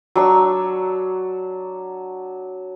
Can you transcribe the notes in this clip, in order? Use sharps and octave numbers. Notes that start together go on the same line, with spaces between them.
F#3 D4 C#6 E6